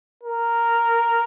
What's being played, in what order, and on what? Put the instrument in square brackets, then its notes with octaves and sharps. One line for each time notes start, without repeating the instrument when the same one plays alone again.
[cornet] A#4